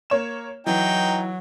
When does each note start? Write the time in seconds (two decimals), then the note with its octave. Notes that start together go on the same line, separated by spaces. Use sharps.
0.10 A#3 C#5 E7
0.66 E3 F#3 D#4 G5